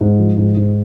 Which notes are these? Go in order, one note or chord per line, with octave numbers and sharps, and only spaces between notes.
G#2
F3
G#2
G#2